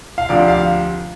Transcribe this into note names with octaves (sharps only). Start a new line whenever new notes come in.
F5
D2 C3 F3 D5
F5